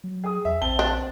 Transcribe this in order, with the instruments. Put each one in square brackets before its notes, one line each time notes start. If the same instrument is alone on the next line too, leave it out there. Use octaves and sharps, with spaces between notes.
[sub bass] F#3
[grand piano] G#4 D#6
[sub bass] E2 [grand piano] E5
[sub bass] A#1 [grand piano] C4 A5 G7
[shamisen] D4